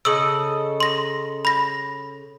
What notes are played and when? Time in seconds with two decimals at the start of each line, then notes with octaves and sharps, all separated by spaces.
0.05 C#3 A4 D#5 E6 F#7
0.80 C6 A#6
1.45 B5 A#6